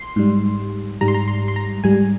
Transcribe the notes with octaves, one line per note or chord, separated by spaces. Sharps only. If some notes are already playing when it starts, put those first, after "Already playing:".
Already playing: C6
G#2 G3
G#2 G3 A#5
C6
A#5
C6
C6
A#5
G#2 G3 G#5